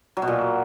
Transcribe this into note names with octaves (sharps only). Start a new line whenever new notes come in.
F#3
B2
A#2